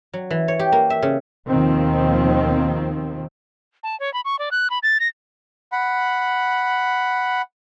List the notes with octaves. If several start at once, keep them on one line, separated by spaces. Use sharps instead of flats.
F#3
E3
C#5
G4
A#3
E5
C#3
D#2 B2 D#3 F3 C4
A5
C#5
B5
C#6
D5
F#6
B5
A6
A#6
F#5 B5